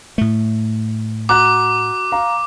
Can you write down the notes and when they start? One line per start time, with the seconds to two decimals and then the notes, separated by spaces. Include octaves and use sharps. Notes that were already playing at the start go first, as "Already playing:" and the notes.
0.18 A2 A3
1.29 F#4 A#5 D6 F#6
2.12 F5 A#5